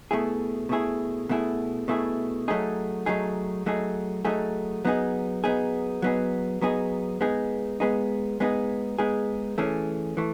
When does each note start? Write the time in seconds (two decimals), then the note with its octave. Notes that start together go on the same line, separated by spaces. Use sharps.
0.11 B2 A3 E4 G#4
0.69 B2 A3 E4 G#4
1.29 B2 A3 E4 G#4
1.88 B2 A3 E4 G#4
2.48 F#3 A3 D#4 G#4
3.06 F#3 A3 D#4 G#4
3.66 F#3 A3 D#4 G#4
4.25 F#3 A3 D#4 G#4
4.85 F#3 B3 D#4 G#4
5.44 F#3 B3 D#4 G#4
6.02 F#3 B3 D#4 G#4
6.62 F#3 B3 D#4 G#4
7.21 G#3 B3 D#4 G#4
7.80 G#3 B3 D#4 G#4
8.40 G#3 B3 D#4 G#4
8.99 G#3 B3 D#4 G#4
9.58 E3 A3 C#4 G#4
10.17 E3 A3